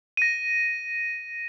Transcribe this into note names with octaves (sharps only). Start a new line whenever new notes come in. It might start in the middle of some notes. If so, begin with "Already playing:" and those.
A#6 D#7